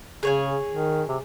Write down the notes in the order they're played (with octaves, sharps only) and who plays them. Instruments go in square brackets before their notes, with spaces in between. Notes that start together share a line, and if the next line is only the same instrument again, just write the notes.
[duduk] C#3 [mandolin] G#4 C#5 G#5
[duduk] D#3
C3